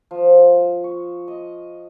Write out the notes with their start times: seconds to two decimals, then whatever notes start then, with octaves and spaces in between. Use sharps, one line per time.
0.11 F3
0.84 C#6
1.28 D#5